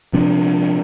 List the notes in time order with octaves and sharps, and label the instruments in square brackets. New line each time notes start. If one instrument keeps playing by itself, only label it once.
[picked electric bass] C3 F3 D4